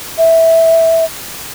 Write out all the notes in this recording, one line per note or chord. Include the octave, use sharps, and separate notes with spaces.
E5